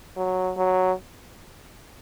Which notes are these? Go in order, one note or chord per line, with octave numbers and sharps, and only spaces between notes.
F#3
F#3